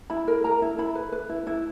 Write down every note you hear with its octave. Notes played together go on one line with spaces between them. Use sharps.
E4 B5
A#4
A#4 A#5
E4
E4 B5
B4
B4
E4
E4